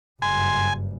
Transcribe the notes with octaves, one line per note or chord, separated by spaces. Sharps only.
F#1 G2 G#5 C6